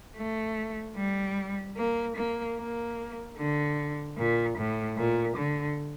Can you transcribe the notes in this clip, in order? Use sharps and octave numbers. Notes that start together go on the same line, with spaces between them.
A3
G3
A#3
A#3
A#3
D3
A#2
A2
A#2
D3